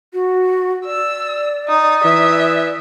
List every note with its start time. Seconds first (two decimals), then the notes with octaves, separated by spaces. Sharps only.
0.14 F#4
0.85 D5 E6
1.68 D#4 D#6
2.04 E3 E5